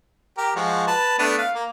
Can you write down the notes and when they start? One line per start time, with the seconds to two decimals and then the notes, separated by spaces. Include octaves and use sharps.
0.38 G4 A#4
0.56 F3 G#3 F#4
0.87 B4 A5
1.19 A3 B3 D4
1.38 F5
1.55 A#3